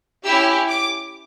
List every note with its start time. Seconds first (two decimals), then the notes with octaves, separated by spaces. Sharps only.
0.25 C#4 E4 G4 E6
0.69 D6